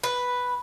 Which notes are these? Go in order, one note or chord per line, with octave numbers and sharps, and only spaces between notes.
B4